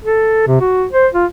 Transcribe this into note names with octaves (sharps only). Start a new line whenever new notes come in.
A4
C3
F#4
C5
F4